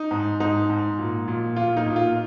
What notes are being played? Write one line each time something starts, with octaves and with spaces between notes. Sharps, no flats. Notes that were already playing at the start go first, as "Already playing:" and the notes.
Already playing: D#4
G#2
G#2 D#4
G#2
A#2
A#2
A#2 F4
D#4
A#2
F4